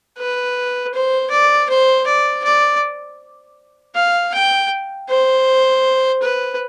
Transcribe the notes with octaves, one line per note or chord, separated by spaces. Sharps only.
B4
C5
D5
C5
D5
D5
F5
G5
C5
B4